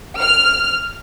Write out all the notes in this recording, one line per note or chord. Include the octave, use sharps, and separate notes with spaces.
F6